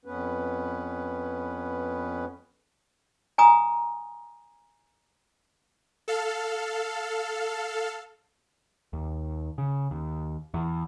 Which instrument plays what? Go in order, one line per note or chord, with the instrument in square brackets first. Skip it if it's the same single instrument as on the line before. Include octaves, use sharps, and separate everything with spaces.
[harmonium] F2 B3 C#4 B4
[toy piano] G#5 A#5 D#6
[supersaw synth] A4 F5
[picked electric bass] D#2
C#3
D#2
E2